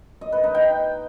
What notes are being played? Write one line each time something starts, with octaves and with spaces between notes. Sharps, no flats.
D#5
B4
D#4
G5